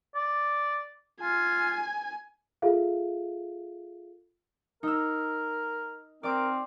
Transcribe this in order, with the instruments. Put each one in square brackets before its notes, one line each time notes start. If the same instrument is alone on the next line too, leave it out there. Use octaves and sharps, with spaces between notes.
[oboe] D5
[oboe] F4 [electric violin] G#5
[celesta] F4 G#4 A4 E5 F5
[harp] D#4 E6 [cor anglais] A#4
[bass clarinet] C4 [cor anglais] A#4 [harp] D5 D6